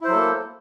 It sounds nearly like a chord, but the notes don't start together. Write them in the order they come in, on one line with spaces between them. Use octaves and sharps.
E4 C5 F#3 A4 A#3